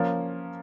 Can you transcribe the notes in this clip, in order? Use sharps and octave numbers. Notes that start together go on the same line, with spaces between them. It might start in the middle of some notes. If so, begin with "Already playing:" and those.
Already playing: F3 A#3 C#4